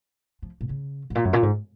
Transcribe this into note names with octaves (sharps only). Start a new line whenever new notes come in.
F3
A#2
C#3
G#2
A#2
F#2
A#2
G#2